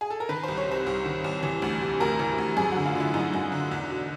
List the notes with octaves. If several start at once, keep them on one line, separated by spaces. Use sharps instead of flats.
G#4
A4
A#4
D#3 B4
C2 C5
C#5
C3 C5
C2
D#3
C2
E3
D2
C3
D2 A#4
E3
D2
F#2 G#4
D3 F#4
F4
D3 E4
F#2 D#4
F#2
D3
E2
B2